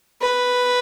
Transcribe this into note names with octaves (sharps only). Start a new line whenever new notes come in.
B4